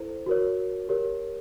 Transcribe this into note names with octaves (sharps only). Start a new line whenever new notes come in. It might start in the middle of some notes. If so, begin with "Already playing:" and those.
Already playing: E4 A4 C5
F#4 A#4 C#5
G4 A#4 C#5